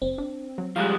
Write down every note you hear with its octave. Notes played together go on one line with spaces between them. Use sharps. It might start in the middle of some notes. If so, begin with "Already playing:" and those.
F#1 C4
D4
F#3
F3 G3 G#3 F5 A#5 F#6